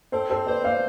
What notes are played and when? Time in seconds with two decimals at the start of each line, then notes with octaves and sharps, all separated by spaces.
0.12 C4 A4 C5
0.30 A4 C5
0.47 B4 C5 D5
0.64 D5 F5